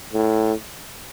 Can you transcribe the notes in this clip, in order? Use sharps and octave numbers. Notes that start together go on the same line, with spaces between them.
A2